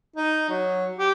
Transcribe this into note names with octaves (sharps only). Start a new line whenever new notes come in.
D#4
F#3
G4